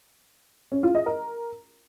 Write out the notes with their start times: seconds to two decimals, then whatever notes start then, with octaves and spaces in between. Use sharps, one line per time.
0.72 C#4
0.83 F4
0.95 D#5
1.06 A#4